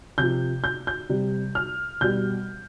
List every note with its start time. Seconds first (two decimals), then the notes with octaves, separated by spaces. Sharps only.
0.18 C3 F3 G6
0.64 G6
0.87 G6
1.09 C3 G3
1.55 F6
2.01 B2 G3 G6